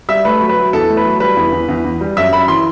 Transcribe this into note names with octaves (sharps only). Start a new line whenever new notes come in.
G3 E5
A3 B4
F#3
B4
F#3
E2 A4
A3
B4
F#3
G3 B4
E2
E2
E2
E2
G3
F#2 E5
F#2 B5
E3 C6